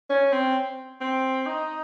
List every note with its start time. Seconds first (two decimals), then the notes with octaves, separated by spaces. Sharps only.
0.10 C#4
0.33 C4
1.01 C4
1.47 D#4